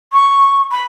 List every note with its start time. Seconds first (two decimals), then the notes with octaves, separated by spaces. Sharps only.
0.13 C#6
0.71 B5